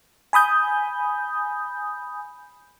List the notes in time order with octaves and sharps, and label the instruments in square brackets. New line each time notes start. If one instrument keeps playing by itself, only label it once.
[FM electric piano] G#5 B5 D#6 G6